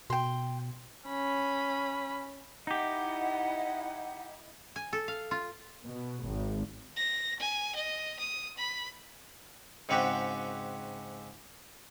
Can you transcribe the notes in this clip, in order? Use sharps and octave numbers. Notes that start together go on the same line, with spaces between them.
B2 G5 C6
C#4 B5
D#4 E4 G4 D#5 F#5
G#5
A4
F5
F4
B2
G#1
A#6
G#5
D#5
D#6
B5
G#2 C#3 C4 D4 F#4 G4